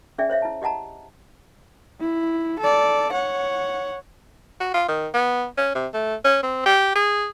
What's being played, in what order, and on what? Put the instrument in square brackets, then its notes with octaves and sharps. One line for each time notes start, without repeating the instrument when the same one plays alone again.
[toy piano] C#4 G#4 D5 E5 G5 G#5
C5 C#5 E5 F5
E4 A5
G4 D#5 F#5 A5 A#5
[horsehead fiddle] E4
A4 D5
C#5 F#5
[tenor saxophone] F#4
F4
D#3
B3
C#4
C3
A3
C#4
C4
G4
G#4